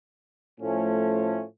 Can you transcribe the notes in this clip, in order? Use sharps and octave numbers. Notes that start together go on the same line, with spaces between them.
A2 F3 A3 C#4